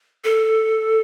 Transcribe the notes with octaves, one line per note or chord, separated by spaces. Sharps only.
A4